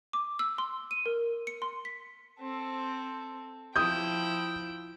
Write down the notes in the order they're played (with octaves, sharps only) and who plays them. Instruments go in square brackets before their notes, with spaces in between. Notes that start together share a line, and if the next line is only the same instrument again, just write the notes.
[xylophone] D6
E6
C6
D#7
A#4
C#7
C6
B6
[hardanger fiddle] C4 A4
[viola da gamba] F3 E4 [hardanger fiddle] G5 [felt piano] D#6 G6